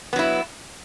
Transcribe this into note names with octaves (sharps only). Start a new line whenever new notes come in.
F#3 B3 E4